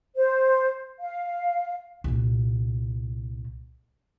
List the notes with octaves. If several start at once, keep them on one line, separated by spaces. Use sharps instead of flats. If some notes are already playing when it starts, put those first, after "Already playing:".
C5
F5
C2 A#2